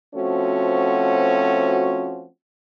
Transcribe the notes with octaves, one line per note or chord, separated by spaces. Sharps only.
F3 A3 C4 C#4 F#4